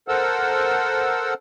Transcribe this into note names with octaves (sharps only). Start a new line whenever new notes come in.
A4 A#4 C5 F#5 E6